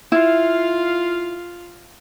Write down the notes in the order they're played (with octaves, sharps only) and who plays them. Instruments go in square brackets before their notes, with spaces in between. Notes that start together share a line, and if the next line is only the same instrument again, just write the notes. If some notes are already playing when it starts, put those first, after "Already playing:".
[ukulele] E4 [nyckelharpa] F4 F5